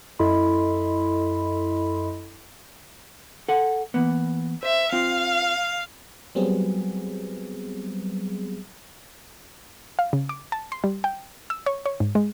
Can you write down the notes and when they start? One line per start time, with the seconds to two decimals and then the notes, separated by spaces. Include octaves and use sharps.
0.19 F#2 E4 A4 D#5 B5 C6
3.49 A4 F#5
3.94 E3 A#3 B3
4.63 C5 E5
4.92 C4 F4 F5
6.35 F#3 G3 B3 C4 G#4
9.99 F5
10.13 C#3
10.29 D6
10.52 A5
10.72 C6
10.84 G3
11.04 G5
11.50 E6
11.66 C#5
11.86 C#5
12.00 G#2
12.15 G#3